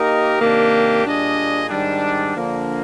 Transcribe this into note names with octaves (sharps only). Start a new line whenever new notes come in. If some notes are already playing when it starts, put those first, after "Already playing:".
Already playing: A#3 D#4 G4 A#4 D#5
C3 D#3 A#3 D4 G4
A#2 G3 D4 G#4 D#5
G#2 D#3 G3 D4
D3 F3 A#3 D4